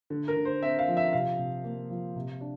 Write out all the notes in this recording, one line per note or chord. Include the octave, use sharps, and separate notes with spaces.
D3
A#4
D3
C5
C4 E5
F5
F3
E5
C3 F5
C3
A#3
F3
C3
D4